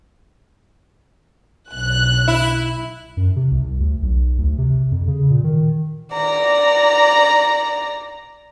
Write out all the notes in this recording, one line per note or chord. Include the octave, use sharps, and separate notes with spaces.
B1 F#6
E4
F#2
C3
C2
D2
B1
D2
C3
F2
C#3
A#2
D#3
D5 A#5